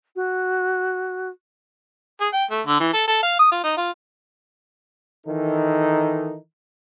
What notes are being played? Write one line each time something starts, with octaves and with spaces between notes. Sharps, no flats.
F#4
G#4
G5
A3
D3
E3
A4
A4
F5
D#6
F4
D#4
F4
D#3 E3 D#4 A4